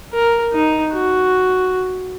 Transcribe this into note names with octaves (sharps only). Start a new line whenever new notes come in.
A#4
D#4
F#4